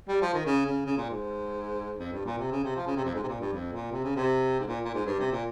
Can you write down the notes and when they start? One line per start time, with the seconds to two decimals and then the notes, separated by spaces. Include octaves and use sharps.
0.09 G3
0.22 F3
0.34 D#3
0.46 C#3
0.66 C#3
0.86 C#3
0.97 A#2
1.10 G#2
1.99 F2
2.13 G2
2.25 A#2
2.38 C3
2.51 C#3
2.64 C3
2.76 F3
2.86 C#3
2.96 C3
3.05 F2
3.15 G#2
3.23 C3
3.28 A#2
3.40 G2
3.53 F2
3.73 A#2
3.92 C3
4.04 C#3
4.16 C3
4.59 G#2
4.68 A#2
4.85 A#2
4.94 G#2
5.06 G2
5.19 C3
5.32 A#2